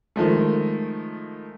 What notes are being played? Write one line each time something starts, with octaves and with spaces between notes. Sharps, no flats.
D#3 F3 G#3 A3